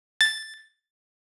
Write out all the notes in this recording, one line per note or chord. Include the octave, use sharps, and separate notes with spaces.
A6